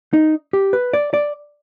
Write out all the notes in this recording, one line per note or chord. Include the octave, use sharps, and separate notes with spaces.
D#4
G4
B4
D5
D5